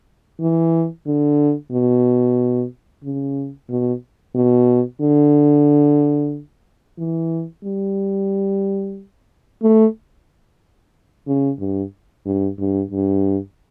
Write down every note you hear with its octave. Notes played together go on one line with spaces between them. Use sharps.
E3
D3
B2
C#3
B2
B2
D3
E3
G3
A3
C#3
G2
G2
G2
G2